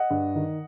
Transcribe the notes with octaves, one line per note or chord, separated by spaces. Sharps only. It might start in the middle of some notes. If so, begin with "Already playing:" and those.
Already playing: D#5 F#5
G2
D#3